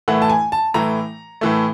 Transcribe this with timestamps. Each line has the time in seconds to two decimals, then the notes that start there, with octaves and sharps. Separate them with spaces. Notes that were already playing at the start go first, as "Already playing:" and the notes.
0.08 A2 E3 A3 F#5
0.22 A5
0.29 G#5
0.52 A5
0.74 A2 E3 A3 A#5
1.41 A2 E3 A3